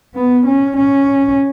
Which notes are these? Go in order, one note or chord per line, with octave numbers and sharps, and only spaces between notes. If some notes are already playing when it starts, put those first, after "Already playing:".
B3
C#4
C#4